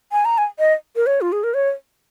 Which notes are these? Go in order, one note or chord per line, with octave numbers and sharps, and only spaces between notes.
G#5
A#5
G#5
D#5
A#4
C#5
F4
G#4
A#4
C#5